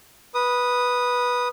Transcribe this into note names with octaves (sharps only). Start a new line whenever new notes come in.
B4 D#6